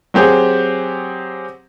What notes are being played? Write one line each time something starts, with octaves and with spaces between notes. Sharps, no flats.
F#3 C4 G4 G#4